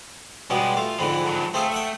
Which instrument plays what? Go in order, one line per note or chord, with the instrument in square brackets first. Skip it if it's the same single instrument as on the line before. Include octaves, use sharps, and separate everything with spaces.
[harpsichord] B2 G3 B3 [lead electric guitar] G#3 C#4
[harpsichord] A3 [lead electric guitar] F4
[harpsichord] F2 G#2 D3 [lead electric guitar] E3
[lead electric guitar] G2 F#3
[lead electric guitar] A3 [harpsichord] C4 G#4 F5
[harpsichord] E5 F#5 G5